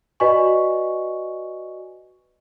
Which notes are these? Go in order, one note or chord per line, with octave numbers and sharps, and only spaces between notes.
F#4 B4 D5 D#5 G#5 C#6